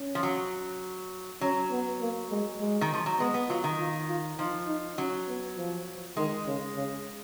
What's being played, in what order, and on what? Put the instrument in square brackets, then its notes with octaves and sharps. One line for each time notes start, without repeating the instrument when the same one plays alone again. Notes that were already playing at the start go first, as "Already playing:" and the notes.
Already playing: [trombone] C#4
[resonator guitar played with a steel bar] F3
F#3
[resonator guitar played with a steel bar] F#3 [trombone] C#4
[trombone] B3
A#3
G#3
G#3
[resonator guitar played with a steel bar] D#3
F3
F#3
[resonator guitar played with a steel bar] G#3 [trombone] B3
[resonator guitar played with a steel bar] B3
[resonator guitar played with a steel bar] F#3 [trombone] F4
[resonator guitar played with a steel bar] D#3
[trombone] F4
F4
[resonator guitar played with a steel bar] F3 [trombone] D#4
[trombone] D#4
[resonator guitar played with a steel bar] F#3 [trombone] C#4
[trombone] B3
F3
[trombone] D#3 [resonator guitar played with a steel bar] G#3
[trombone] C#3
C#3